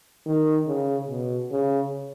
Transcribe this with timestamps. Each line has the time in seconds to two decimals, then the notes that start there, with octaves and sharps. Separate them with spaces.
0.26 D#3
0.67 C#3
1.09 B2
1.51 C#3